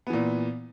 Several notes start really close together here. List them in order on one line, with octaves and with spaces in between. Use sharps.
B3 E3 A#2